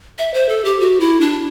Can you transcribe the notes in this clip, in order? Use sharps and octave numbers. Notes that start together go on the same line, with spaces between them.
E5
C5
A4
G4
F#4
E4
D4